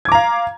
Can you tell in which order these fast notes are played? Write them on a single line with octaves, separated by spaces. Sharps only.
G#6 D6 A#5 F5